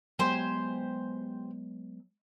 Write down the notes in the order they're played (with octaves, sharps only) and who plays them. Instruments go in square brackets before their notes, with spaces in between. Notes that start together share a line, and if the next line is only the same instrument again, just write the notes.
[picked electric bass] F#3 G#3 B3 [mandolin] G4 C5 G#5